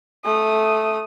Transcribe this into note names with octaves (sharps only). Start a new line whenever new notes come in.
A3 D#6